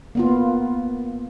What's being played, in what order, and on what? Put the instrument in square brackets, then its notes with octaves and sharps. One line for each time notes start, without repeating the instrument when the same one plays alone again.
[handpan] A#3 B3 F4